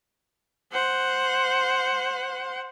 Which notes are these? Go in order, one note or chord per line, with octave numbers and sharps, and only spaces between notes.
C5 F#5